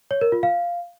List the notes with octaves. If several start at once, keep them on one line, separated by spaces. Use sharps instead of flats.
C#5
A#4
F4
F5